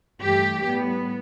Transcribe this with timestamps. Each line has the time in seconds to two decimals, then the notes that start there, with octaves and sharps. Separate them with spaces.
0.21 G2 E3 A3 G4
0.66 A2 G3 B3